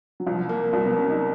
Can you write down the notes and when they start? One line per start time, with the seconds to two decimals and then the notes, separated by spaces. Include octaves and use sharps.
0.20 F#3
0.26 C2 F3
0.49 A#3
0.73 C2 F#3
0.86 B3
0.97 F#3 C#4
1.09 D#4